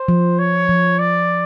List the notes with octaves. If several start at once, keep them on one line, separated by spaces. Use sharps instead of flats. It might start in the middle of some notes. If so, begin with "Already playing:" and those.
Already playing: C5
F3
C#5
F3
D5